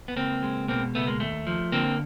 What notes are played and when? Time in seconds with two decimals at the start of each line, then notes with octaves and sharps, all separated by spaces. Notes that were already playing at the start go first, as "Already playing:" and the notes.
0.08 B3
0.16 C#2 A#3 C4
0.43 G#3
0.68 B2 A#3 C4
0.95 C#2 A3 B3
1.07 G#3 A#3
1.20 D#2 A3
1.47 F3
1.72 D3 A#3 C4